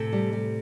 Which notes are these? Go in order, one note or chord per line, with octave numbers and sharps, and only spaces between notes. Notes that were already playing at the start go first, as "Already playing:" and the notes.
Already playing: A2 C3 A4
G3
G3